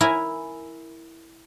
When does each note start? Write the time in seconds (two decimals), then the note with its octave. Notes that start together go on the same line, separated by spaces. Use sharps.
0.01 E4 A#4 E5 G#5 A#5